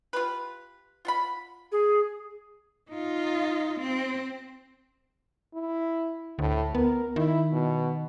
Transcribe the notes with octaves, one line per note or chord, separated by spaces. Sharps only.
F4 G4 B4
F4 F#5 B5
G#4
D#4 F4
C4
E4
D2 A2
B3 A#4
D#3 E4
B2